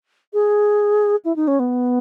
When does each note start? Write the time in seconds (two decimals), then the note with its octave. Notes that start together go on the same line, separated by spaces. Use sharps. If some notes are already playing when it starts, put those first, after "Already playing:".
0.33 G#4
1.25 E4
1.36 D#4
1.47 C#4
1.59 B3